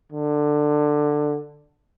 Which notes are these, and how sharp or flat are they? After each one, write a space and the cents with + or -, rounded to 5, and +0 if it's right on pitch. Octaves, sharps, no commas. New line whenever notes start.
D3 +15